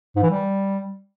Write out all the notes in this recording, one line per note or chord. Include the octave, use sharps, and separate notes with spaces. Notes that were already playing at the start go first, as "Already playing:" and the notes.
G#2
E3
G3